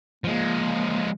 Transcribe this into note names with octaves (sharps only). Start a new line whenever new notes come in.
F3 G#3 A#3